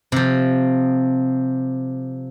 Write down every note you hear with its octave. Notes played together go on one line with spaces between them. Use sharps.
C3 F3